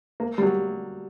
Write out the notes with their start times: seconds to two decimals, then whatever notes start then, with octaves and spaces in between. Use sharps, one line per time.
0.20 A#3
0.38 G3
0.43 F#3